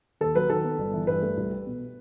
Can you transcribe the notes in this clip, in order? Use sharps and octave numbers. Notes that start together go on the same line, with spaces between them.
D#2 A4
F#3 B4
D#3 A4
B3
G1
E3
G2 B4
A3
C2
G3
B2